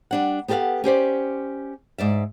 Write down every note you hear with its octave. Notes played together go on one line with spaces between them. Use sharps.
G3 D4 F#5
B3 G4 A4 C5 F5 F#5
C#4 G4 C5 D5
G#2 D5 E5